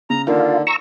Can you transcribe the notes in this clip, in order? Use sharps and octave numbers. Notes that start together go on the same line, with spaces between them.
C#3 A#5
D3 D#3 A#3 F4
A#5 C#6 E6